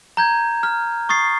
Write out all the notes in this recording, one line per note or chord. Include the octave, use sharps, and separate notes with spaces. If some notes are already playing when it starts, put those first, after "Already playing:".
A#5 G6 G#6
F6
C#6 D#6 A6 C7